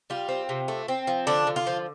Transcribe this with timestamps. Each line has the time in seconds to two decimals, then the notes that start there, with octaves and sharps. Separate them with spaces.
0.10 G3 F4
0.28 C4
0.49 C3
0.68 A3
0.88 C4
1.07 F3
1.27 D3 D4
1.47 D3
1.56 F4
1.67 F3